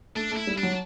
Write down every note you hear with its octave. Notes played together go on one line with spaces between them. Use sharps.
A3 D4
A3
E4
G3
D4
F#3